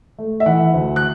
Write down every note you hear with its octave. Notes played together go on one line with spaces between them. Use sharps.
A3
E5
E3 F#5
D2
F#6